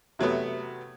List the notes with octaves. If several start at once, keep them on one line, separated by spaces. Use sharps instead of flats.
C3 F#3 A3 B3